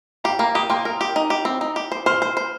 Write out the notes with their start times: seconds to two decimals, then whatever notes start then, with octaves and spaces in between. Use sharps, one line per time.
0.24 G4 F5 A#5
0.39 A#3 F5 A#5
0.55 G4 A#5 D#6
0.70 A#3 G5 C6
0.85 A#4
1.01 G4
1.16 D#4
1.30 G4
1.45 C4
1.61 D#4
1.76 G4
1.92 C5
2.06 C5 C6 F6
2.22 C5
2.37 C5